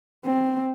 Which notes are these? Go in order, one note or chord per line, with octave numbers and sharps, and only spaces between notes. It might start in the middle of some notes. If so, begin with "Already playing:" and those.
C4